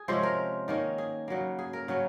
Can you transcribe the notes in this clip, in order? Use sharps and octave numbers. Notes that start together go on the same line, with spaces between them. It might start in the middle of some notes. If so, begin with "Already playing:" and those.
Already playing: G#4
C3 F3 G#3 C#4 C5
A#4
D#3 A#3 C#4
G#4
C#3 F#3 A#3
G#4
A#4
C#3 F#3 C#4